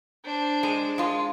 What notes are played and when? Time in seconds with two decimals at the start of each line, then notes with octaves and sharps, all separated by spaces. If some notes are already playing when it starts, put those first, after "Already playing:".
0.25 D4 C5
0.63 G#3
0.98 G#3 F4